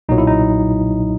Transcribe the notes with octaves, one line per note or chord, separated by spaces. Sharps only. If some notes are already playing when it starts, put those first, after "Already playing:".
B1 A#2 F#3 D#4
E4
D#4